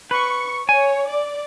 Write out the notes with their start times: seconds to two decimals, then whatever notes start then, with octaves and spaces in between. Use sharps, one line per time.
0.11 B4 C#6
0.69 C#5 G#5
1.08 D5